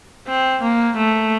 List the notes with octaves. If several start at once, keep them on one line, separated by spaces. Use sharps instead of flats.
C4
A#3
A3